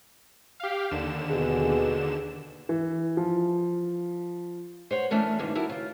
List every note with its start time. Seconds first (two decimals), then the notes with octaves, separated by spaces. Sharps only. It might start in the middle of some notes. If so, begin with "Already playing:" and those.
0.60 G4 F5
0.91 D#2 D3 E7
1.29 B2 G4 G#4
2.69 E3
3.17 F3
4.91 C5 C#5 F#5
5.11 E3 A3 C#4 D4 A#4
5.39 E2 G2 B2 D3 D#3
5.55 E4 F#4 G4 A#4 A5
5.69 C#3 F4